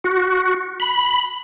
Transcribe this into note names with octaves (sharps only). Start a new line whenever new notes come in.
F#4
B5